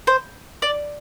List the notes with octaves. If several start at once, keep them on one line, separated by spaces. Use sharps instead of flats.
C5
D5